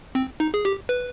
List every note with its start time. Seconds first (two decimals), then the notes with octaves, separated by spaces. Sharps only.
0.15 C4
0.40 D#4
0.54 G#4
0.65 G4
0.89 B4